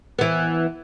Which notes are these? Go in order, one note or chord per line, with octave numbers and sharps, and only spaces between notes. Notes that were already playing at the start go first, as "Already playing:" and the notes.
E3 B3